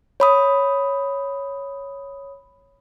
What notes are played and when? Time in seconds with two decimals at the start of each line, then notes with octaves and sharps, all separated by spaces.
0.20 C#5 B5 D#6